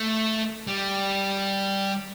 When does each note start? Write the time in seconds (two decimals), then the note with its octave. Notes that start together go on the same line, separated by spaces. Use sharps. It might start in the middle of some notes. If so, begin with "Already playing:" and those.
Already playing: A3
0.67 G3